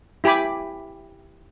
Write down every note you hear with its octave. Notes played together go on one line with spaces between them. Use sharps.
E4 G4 G#5 B5 D6